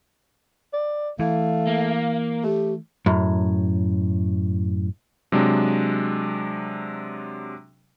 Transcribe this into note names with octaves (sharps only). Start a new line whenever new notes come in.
D5
E3 A3 F5
A#3
A3 G4
F#2 A2
C3 F#3 G#3 D4